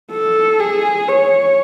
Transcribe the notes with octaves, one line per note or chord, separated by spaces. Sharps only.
A4
G#4
C#5